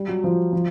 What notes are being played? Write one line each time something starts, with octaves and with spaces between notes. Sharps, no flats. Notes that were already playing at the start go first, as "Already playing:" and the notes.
Already playing: G3
F#3
F3
F3